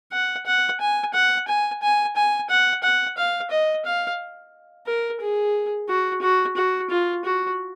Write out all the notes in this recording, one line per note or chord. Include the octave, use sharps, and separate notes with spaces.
F#5
F#5
G#5
F#5
G#5
G#5
G#5
F#5
F#5
F5
D#5
F5
A#4
G#4
F#4
F#4
F#4
F4
F#4